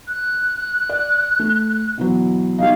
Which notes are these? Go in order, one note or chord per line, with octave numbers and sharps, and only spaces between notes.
F#6
D5
A3
B2 E3 F#3
B1 G3 D#4 F5